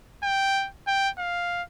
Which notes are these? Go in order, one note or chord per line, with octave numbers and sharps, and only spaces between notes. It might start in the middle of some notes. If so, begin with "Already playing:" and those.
G5
G5
F5